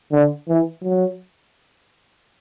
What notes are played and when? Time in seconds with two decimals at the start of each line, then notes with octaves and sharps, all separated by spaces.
0.12 D3
0.48 E3
0.83 F#3